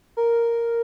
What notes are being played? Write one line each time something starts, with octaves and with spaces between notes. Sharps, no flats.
A#4